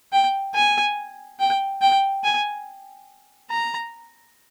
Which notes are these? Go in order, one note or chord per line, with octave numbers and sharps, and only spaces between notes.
G5
G#5
G5
G5
G#5
A#5